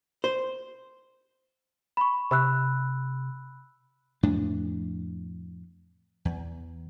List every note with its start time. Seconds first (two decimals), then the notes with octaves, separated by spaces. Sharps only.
0.24 C5
1.97 B5 C#6
2.31 C3 B5 E6 F#6
4.23 F2 A2 D4
6.25 E2